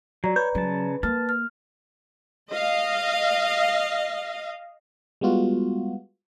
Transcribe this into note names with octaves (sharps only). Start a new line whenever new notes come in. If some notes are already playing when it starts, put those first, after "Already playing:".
F#3 D5 A#5
B4 C#5 G6
C#3 F#3 A5
A#3 A5 F6
F6
D#5 F5
G3 G#3 B3 F4 F#4